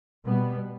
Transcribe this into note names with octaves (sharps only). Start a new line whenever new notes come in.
B2 G3 B3